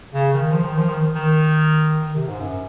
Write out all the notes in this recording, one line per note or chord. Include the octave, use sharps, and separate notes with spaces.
C#3
D#3
F3
D#3
F3
D#3
D#3
D#3
C3
G#2
F#2